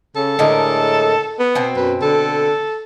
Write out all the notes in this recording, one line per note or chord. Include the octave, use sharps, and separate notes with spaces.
C#3 A4
A2 D3 G#3 A#4
B3
B2 C4
F#2 B4
D3 A4